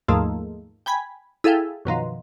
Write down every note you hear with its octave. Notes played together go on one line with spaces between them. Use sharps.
D#2 G#2 F3 A3 A#3
G5 G#5 B5 G#6
E4 G#4 A4 F5 G5
F#2 B2 D#3 F3